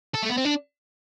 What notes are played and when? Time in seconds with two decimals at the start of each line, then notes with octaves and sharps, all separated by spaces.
0.15 A4
0.23 A3
0.30 B3
0.38 C4
0.45 D4